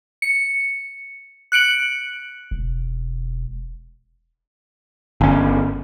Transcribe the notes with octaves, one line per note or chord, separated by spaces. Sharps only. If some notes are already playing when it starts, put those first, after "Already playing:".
C#7
F#6 C#7 D7 F#7
E1
G1 C#4